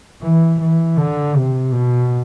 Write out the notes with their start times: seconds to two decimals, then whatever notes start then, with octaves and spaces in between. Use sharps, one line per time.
0.23 E3
0.61 E3
0.97 D3
1.36 C3
1.72 B2